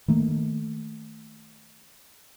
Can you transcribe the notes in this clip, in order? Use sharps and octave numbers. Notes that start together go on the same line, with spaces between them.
D#3 A3 A#3